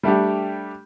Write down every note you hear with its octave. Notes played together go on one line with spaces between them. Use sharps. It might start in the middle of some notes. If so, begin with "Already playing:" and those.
G3 A3 D4 G4